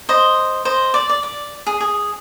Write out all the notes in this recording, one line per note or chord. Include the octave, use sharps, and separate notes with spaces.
C5 D#5
C5 D#5
D5
D5
D5
G#4
G#4